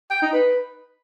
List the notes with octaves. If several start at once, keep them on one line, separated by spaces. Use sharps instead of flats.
G5
D#4
B4